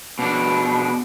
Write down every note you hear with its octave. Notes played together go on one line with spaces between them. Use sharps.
B2 D4